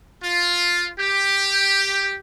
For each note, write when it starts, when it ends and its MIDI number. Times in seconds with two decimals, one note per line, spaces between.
0.23 0.90 65
0.99 2.18 67